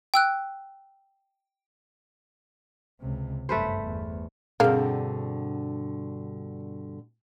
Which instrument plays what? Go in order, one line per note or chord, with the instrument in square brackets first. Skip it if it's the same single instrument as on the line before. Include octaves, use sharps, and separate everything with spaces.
[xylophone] G5 E6 F#6
[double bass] C#2 C3
[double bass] G1 F#2 [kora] A3 B4 C5
[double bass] E2
[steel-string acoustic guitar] G2 B2 [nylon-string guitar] D3 C4 [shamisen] A#3 D4 F5 [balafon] G#4